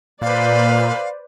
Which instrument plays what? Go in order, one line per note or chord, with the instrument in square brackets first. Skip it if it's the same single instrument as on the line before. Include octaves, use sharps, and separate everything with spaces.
[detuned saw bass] A#2 [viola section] B4 C5 D5 [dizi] F5